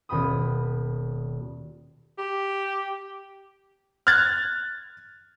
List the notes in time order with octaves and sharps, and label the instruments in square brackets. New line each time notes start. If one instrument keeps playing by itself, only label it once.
[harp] D#1 B2 G5 B5 D#6
[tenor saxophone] G4
[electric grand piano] F6 F#6 G#6 A6